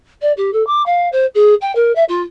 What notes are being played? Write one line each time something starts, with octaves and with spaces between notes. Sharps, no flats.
D5
G4
A4
D6
F5
C5
G#4
G5
A#4
E5
F4